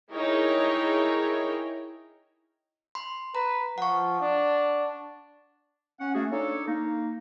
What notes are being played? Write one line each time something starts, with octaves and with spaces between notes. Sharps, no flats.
D#4 E4 G#4 A#4 C#5 G5
B5 C6
B4 A#5
F3 F#5 C#6
D4
C#4 F#5
A3 A#3 C#4 F#4 G#4
D4 D#4 A4 C#5
A#3 D#4